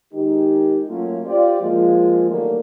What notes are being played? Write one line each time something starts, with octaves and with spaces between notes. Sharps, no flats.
D#3 G#3 D#4 G4
F#3 A3 A#3 C#4 F4
F4 G4 C5 D5
F3 G#3 A#3 F4
D3 D#3 F#3 G3 A3 A#3